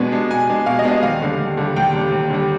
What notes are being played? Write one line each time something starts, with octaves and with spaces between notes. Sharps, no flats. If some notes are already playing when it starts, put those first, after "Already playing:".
Already playing: B2 G#3 B3 D4
G#3 B3 D4
B2 G#5
G#3 B3 D4
B2 F5
D#5
G#3 B3 D4
D#5
D#2 F5
D3 G3
D#2
D3 G3
D#2 G5
D3 G3
D#2
D3 G3